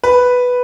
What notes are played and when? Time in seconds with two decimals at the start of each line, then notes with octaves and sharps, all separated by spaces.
0.04 B4